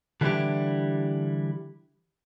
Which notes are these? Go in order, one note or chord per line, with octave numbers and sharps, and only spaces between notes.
D3 E3 G3 D4 E4 G4